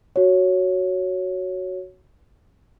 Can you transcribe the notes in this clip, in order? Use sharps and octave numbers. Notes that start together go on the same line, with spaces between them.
F#4 C#5